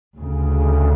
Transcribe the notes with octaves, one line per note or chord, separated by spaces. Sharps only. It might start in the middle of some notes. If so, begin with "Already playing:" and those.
D2 C#3